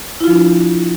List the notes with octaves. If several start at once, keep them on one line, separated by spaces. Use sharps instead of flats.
F3 D4 E4 F4